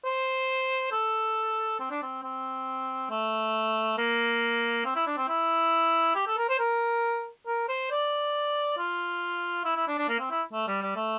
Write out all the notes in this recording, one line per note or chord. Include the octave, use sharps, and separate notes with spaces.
C5
A4
C4
D4
C4
C4
A3
A#3
C4
E4
D4
C4
E4
G4
A4
A#4
C5
A#4
A#4
C5
D5
F4
E4
E4
D4
D4
A#3
C4
E4
A3
G3
G3
A3